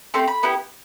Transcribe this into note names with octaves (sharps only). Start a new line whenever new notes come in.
A3 C4 G4 C6
B5
B3 E4 G4